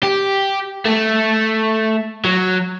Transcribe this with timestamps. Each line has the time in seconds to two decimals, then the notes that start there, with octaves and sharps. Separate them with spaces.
0.03 G4
0.86 A3
2.25 F#3